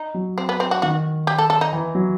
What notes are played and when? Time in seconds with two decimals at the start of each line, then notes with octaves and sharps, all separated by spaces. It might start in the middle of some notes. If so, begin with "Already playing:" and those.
Already playing: D#4
0.14 F#3
0.38 C4
0.49 B3
0.60 C4
0.71 F#4
0.82 D#3 F#4
1.27 G4
1.38 A4
1.50 A4
1.61 D#4
1.73 E3
1.95 F#3